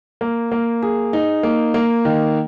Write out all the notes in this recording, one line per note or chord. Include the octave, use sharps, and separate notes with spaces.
A#3
A#3
G#4
D#4
A#3
A#3
D#3